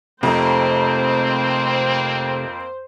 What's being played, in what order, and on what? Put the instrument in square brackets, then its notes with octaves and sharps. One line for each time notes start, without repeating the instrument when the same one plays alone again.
[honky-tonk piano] F2 [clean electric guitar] C3 A3 D#4 [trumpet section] A#3 C4 [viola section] C5